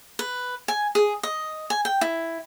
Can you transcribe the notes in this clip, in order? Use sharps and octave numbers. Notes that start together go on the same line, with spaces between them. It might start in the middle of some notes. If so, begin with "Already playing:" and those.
B4
G#5
G#4
D#5
G#5
G5
E4